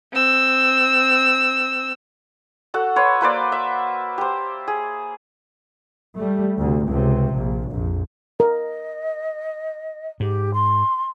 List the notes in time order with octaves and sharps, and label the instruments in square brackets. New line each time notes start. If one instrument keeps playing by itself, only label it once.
[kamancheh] C4 E6
[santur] F#4 A4 F#5
B4 C#5 C6
A#3 B4 C5 D5
E5
G4 C5
G#4
[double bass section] G3 A3
D2 C3
C#2 C3
A#1
A#1 F2
[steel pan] A#4 [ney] D#5
[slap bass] G#2 [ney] G4
[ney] C6